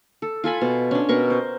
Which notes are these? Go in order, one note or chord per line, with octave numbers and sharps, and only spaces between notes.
A4
F4 A4 G#5 B5
B2
C#4 D4
B2 A#4 C#6
C5